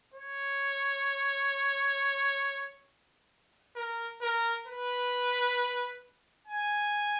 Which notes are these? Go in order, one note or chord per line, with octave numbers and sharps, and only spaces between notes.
C#5
A#4
A#4
B4
G#5